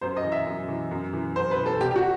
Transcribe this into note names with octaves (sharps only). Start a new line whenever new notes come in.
F#2 C5
D#5
E3
E5
F#2
E3
F#2
E3
F#2 C5
B4
E3
A4
C2 G4
G4
F#4